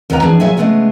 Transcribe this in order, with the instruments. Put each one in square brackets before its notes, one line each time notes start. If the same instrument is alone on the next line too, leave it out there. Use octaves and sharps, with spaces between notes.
[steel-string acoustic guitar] D#2 B3 A#4 B4 G5 A#5
E3 D4 G#4
A#2 F#3 G#4 E5 G#5
C#3 F#3 G#3 A3 B3 G#4